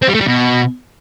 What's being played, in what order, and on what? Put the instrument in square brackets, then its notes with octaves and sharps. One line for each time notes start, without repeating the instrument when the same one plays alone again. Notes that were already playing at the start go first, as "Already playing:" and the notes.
[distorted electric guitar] C4
G3
A3
G3
B2